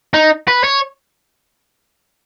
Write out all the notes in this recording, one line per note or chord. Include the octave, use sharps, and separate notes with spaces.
D#4
B4
C#5